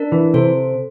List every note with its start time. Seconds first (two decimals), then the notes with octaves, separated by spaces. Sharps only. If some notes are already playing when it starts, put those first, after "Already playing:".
Already playing: D4 A#4
0.12 E3
0.34 C3 A4 C5